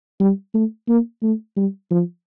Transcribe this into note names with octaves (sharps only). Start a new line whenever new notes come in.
G3
A3
A#3
A3
G3
F3